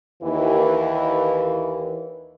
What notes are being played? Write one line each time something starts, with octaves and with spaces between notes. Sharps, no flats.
D#2 E3